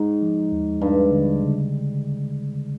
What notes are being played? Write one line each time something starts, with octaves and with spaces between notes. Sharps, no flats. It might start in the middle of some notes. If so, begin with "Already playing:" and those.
Already playing: G#2 G#3
F3
D#2
G2 G#3
D3
C#3